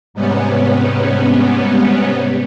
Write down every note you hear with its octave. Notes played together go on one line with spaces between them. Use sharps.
G#2 C3 G3 B3 C#4